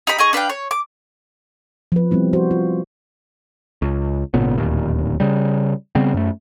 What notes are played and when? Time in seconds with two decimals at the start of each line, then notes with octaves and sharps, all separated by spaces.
0.07 D#4 G4 B5
0.18 D#4 G#4 D#5 C#6
0.33 D4 B4 F5 G5
0.49 C#5
0.71 D6
1.92 F3 B4
2.11 G3 B3 C4 E4
2.33 F#4 C5
2.51 F4
3.82 C#2
4.34 G#1 A#2 C#3 B3
4.58 D1 D#2 A#2
5.20 C#3 G3
5.95 C#3 G3 B3 C4
6.14 F#2 A3